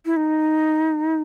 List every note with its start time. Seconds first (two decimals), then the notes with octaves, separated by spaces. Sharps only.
0.06 E4
0.17 D#4